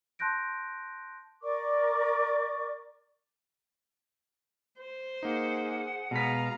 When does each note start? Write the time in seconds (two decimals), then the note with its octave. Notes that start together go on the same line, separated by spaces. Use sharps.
0.19 A5 C6 F#6 G6 A#6 D7
1.43 A#4 D5 C#6 D6
4.80 C5
5.23 A#3 D#4 G#4 F#5
6.11 B2 G#3 B3 F5 A#5 B6